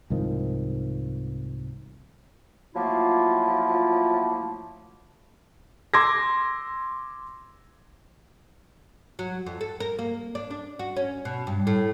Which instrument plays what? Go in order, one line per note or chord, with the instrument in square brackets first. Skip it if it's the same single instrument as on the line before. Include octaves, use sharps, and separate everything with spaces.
[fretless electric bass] C2 G#2 D#3 F3
[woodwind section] F3 F#3 A3 A#3 E4 F4
[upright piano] C6 D6 E6 G#6 A#6
[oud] F#3
F2
A4
A#4
A#3
D4
D4
F#4
C#4
B2
G2
A2